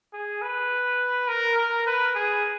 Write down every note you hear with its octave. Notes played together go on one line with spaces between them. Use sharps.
G#4
B4
A#4
A#4
B4
G#4